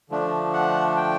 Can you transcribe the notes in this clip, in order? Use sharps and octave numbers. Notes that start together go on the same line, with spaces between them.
D3 F3 A3 D4
F#5
G5